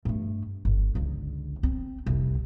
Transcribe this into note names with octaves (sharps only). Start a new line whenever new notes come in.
G2 A3
G1
C#2 D3
C4
F1 C2